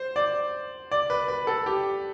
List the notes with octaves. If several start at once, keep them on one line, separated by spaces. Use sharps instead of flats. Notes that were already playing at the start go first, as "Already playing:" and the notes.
Already playing: C5
D5
D5
B4
B4
A4
G4